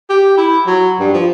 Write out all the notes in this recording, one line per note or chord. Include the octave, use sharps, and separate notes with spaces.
G4
E4
F#3
G2
F3